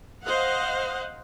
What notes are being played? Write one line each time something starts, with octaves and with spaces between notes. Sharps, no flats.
C5 D#5 F5 F#5